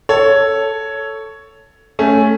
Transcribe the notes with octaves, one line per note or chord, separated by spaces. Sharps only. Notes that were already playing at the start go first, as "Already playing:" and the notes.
A4 C#5
A3 C#4